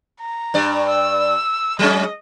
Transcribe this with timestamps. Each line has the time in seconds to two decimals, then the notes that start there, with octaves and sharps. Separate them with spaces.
0.20 A#5
0.54 G2 D5
0.89 E6
1.79 F#3 G#3 C#4 D#5